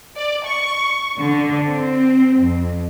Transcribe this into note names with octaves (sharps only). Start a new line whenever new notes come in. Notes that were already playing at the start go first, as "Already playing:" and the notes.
D5
C#6
D3
C4
F2